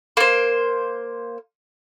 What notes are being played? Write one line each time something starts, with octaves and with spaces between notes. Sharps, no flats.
A#3 C5